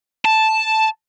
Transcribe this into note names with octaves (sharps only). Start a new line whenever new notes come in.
A5